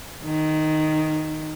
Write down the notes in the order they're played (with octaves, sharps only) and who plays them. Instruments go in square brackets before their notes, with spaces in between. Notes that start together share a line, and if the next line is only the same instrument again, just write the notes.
[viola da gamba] D#3